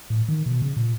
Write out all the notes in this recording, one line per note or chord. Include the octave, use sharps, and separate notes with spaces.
A2
D#3
B2
C#3
A#2